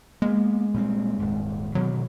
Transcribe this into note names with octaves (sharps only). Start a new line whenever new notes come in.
G#3 A#3 B3
A#2 G3 C4
D#1 G#2
B2 D3 D#3 F#3